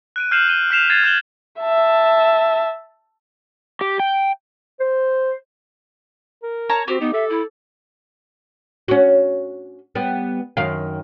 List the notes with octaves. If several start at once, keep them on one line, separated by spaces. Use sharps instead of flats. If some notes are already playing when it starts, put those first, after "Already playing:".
F#6 D7 D#7
F6 G6 C7 D#7 E7 F#7
G6 D#7 G7
F6 G6 B6 C7 E7 F7
G#6 A6 C7 D#7
F6 G6 E7 F#7 G7
E5 A5
G4
G5
C5
A#4
C#5 A5 A#5
C4 F#4 G4
B3 D#4
A4 E5
E4
C#4 F#4
G3 B3
F#2 D#3 F5